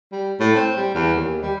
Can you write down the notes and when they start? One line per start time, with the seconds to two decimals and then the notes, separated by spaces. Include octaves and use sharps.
0.12 G3
0.40 A2
0.55 C4
0.77 G3
0.95 E2
1.15 D#2
1.42 G3